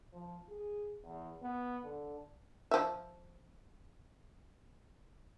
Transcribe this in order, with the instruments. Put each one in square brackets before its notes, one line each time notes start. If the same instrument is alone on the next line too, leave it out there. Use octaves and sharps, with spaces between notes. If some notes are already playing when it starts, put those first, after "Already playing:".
[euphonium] F3
G#4
E2
B3
D3
[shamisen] F3 E5